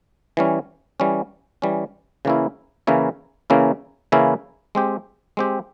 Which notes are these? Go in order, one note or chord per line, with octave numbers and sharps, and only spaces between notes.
E3 G3 C#4
E3 G3 C#4
E3 G3 C#4
C#3 E3 A#3 C#4 E4
C#3 E3 A#3 C#4 E4
C#3 E3 A#3 C#4 E4
C#3 E3 A#3 C#4 E4
G#3 C4 G4
G#3 C4 G4